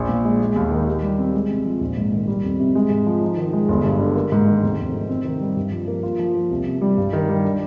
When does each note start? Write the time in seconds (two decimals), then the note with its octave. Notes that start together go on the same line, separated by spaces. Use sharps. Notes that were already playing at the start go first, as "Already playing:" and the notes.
Already playing: A#1
0.09 A#2
0.25 G#3
0.40 G#3
0.56 D#2
0.71 D#3
0.87 G4
1.03 G3
1.19 C4
1.34 G#3
1.50 C3
1.65 F3
1.81 A#1
1.97 G#2
2.12 D#3
2.28 G3
2.44 F2
2.60 C3
2.75 G#3
2.90 G#2
3.06 F3
3.21 D#4
3.37 D#3
3.53 G#3
3.69 G1
3.84 G2
4.00 D3
4.16 A#3
4.32 G#2
4.48 D#3
4.63 F1
4.79 F2
4.95 C3
5.09 C4
5.25 D#3
5.41 G3
5.57 G2
5.72 F3
5.88 A#3
6.03 F4
6.19 F3
6.35 A#3
6.50 C2
6.66 C3
6.82 G3
6.98 G2
7.13 D#3
7.29 G3
7.45 D4